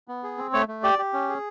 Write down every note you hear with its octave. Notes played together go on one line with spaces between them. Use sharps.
B3
G#4
C4
A3 C#5
A3
G4 D5
G4
C#4
G#4